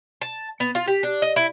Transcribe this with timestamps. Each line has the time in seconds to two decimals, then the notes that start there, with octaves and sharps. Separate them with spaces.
0.22 A5
0.60 B3
0.75 F4
0.88 G4
1.03 D4
1.22 D#5
1.36 E4